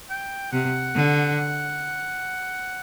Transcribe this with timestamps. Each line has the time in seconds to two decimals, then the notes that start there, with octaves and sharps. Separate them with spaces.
0.10 G5
0.52 C3 F#5
0.95 D3